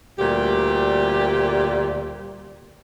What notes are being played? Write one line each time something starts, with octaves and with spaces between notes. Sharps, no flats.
D2 A#2 G3 G4